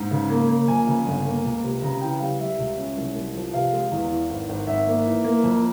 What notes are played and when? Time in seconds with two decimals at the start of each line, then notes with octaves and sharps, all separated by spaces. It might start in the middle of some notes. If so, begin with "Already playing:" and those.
Already playing: G#2
0.11 C#3
0.30 A#3
0.49 A#3
0.68 F2 G#5
0.87 C#3
1.06 G1
1.26 A#3
1.44 C#2
1.63 C3
1.82 C#3 A#5
2.01 E3 G5
2.20 G3 F5
2.40 G3 E5
2.58 C#2
2.77 C#4
2.97 C2
3.15 C2
3.35 F3
3.53 C3 F5
3.72 G#3
3.92 E2
4.11 E3
4.30 G#1
4.49 G#1
4.67 G#1 E5
4.87 A#3
5.06 E3
5.24 A#3
5.43 F2